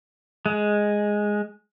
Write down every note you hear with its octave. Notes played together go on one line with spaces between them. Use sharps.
G#3